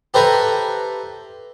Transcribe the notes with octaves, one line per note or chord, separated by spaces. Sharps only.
G4 A4 B4 C5 E5 A#5